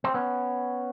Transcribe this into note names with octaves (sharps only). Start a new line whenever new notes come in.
C4
B3 C#4